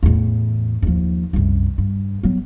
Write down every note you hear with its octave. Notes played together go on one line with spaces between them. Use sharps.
E2 A2
D#2 F3
C2 F#2
G2
F#3 B3